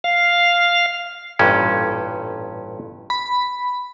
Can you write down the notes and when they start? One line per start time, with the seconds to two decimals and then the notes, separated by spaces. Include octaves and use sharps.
0.04 F5
1.39 A1 G2 A#2 C#4
3.10 B5